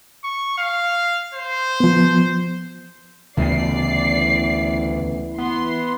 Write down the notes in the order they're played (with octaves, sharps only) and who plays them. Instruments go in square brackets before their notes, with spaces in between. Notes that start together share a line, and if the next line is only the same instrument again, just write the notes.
[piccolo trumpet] C#6
F5
C5
[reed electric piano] F3 B3
[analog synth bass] D2 [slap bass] C#3 A3 B3 [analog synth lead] E3 [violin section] D5 C7
[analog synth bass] B3 [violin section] C6